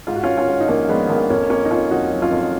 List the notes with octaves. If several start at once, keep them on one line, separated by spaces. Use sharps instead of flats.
G#2 F4
F#4
G#2 C#4 F4
C#4 F4
G#2
D#4
A#1 A#3 C#4
A#1 G#3 B3
A#1 A#3
F2 A#3 C#4
F2 A#3 C#4
D#4
F2 C#4 F4
F1 D#4 F#4
F#3
C#4 F4
F2